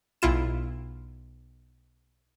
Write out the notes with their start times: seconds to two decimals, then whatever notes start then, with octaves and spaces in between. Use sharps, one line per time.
0.22 B1 E4 F4 E7